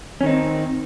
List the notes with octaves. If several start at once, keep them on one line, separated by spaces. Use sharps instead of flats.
D#3 C4 C#4 D#4